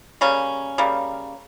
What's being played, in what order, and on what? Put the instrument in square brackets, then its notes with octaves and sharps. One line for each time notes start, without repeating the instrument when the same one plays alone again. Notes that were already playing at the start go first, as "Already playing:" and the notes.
[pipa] C#3 G3 A#3 C#4
C#3 G3 A#3